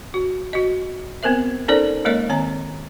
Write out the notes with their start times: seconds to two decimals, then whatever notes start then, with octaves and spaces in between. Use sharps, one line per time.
0.14 F#4
0.53 F#4 D#5
1.23 B3 C4 A#4 C5 E5
1.68 C#4 D#4 A4 A#4 C5 D5
2.05 G#3 A#3 A#4 C#5 D#5
2.29 D#3 C4 C#5 A#5